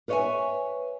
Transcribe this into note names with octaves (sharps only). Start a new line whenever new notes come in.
A#4 B4 C#5 D#5 E5 G#5